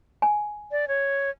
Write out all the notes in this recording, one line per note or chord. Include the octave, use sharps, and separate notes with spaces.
G#5
D5
C#5